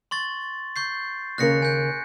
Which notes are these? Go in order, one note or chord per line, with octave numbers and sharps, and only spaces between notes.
C6 C#6 A6
C#6 G6 C7
D#2 C#3 A#4 F#6 A#6 C#7
G#5 G6